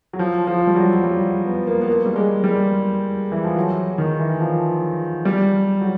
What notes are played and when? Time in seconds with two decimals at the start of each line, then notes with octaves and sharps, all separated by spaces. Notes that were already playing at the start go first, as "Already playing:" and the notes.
0.13 F#3
0.19 F3
0.47 F3
0.67 G3
0.76 F#3
0.93 F#3
1.04 G3
1.45 B3
1.67 A#3
1.81 B3
1.88 A#3
2.06 G3
2.16 G#3
2.44 G3
3.32 E3
3.44 F3
3.56 F#3
3.98 D#3
4.19 E3
4.40 F3
5.25 G3
5.81 F#3